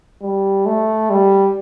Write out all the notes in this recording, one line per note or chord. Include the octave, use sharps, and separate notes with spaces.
G3
A3
G3